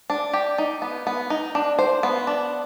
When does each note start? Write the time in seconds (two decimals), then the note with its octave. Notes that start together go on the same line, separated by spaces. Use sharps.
0.10 D4
0.33 G4
0.58 D#4
0.82 B3
1.07 B3
1.30 D#4
1.55 D4
1.79 C5
2.03 B3
2.27 D4